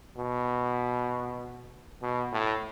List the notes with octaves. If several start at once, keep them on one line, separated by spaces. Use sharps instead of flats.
B2
B2
A2